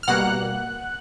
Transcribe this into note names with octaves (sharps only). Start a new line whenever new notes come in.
F6
B2 G3 A#3 F#5 F#6